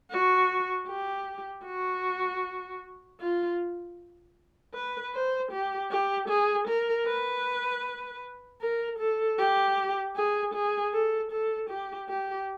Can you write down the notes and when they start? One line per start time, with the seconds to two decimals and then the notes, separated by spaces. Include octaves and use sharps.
0.11 F#4
0.88 G4
1.65 F#4
3.20 F4
4.74 B4
5.14 C5
5.52 G4
5.91 G4
6.29 G#4
6.68 A#4
7.07 B4
8.61 A#4
8.99 A4
9.39 G4
10.16 G#4
10.54 G#4
10.93 A4
11.32 A4
11.70 G4
12.09 G4